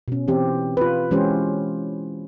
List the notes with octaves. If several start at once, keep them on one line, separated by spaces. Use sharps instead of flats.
B2 C#4
E3 C4 G4
F4 B4
E3 G#3 C#4 G4 C5